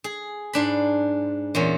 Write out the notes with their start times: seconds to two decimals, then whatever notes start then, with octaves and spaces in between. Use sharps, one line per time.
0.04 G#4
0.53 G#2 D4 B5
1.55 E2 A#2 C#4